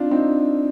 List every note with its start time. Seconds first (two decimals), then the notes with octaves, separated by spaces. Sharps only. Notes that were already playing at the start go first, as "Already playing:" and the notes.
Already playing: C4 D4 D#4 F4
0.11 C4 D#4